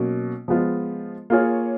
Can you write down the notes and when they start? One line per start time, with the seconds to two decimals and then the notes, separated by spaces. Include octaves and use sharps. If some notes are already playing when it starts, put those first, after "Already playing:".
Already playing: B2 F#3 A#3 C#4
0.48 F3 G#3 B3 F4
1.30 A#3 F4 G#4 C#5